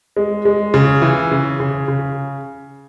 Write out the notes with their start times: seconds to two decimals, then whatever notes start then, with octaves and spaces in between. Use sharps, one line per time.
0.17 G#3
0.45 G#3
0.74 C#3
1.02 E3
1.31 C#3
1.60 C#3
1.88 C#3